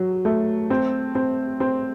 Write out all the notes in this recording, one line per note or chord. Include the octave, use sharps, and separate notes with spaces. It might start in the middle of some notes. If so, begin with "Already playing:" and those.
Already playing: F#3
A3
C4
C4
C4